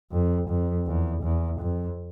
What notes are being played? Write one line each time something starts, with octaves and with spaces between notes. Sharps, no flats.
F2
F2
E2
E2
F2